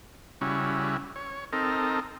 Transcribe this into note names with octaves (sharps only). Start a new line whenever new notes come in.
C#3 G3 C#4 E4 F#4
C#5
C4 D#4 A4 A#4